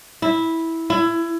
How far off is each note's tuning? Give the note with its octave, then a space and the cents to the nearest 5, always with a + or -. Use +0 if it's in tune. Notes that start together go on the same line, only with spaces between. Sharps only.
E4 -10
E4 +25